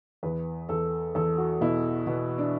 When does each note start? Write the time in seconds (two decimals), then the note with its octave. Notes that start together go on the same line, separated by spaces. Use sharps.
0.23 E2 B4
0.69 E2 A4
1.15 E2 A4
1.38 F#4
1.61 B2 E4
2.07 B2 B3
2.38 D4